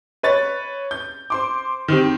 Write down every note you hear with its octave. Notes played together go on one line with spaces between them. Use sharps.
B4 C#5 A6
G6
C5 C6 D6
D#3 C4 G4